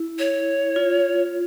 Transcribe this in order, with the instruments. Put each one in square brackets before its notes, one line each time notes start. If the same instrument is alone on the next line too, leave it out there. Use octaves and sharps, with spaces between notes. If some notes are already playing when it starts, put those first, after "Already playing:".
Already playing: [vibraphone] E4
[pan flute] C#5
[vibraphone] F4